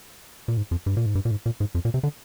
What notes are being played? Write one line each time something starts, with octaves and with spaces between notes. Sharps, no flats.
A#2
G#2
F2
G2
A#2
G#2
G2
A#2
G#2
A#2
G#2
F2
A#2
C3
D3